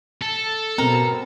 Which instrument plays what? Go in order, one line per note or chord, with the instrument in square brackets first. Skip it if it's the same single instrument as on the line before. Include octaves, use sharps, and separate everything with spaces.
[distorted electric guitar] A4
[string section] B2 [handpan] C4 [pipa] A#4